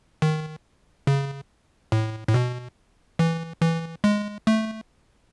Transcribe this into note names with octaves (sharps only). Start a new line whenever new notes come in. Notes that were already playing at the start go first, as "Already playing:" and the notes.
D#3
C#3
A2
A2
B2
E3
E3
G#3
A3